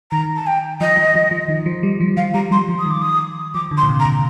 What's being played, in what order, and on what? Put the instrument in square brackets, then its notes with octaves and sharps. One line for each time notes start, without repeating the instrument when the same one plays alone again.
[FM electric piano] D#3 [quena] A#5
[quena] A5
G5
[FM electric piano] F3 [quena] D#5
[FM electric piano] F3
F3
F3
D#3
F3
G3
F3
[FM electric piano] F3 [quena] F5
[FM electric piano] G3 [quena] A#5
[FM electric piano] G3 [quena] C6
[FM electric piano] F3
[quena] D#6
[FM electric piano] D#3 [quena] D6
[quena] D#6
[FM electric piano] F3 [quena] D6
[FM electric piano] D3
[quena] C6
[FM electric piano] A#2
C3
[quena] A#5
[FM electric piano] A#2